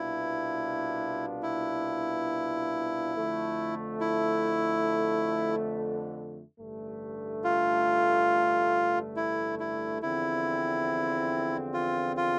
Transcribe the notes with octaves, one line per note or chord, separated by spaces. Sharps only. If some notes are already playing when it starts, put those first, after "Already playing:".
Already playing: C2 B2 B3 D4 E4 F4
E4
F2 D3 A3
E4
A1 G2 D3 A3
F4
E4
E4
E2 D3 F3 C4 E4
F4
F4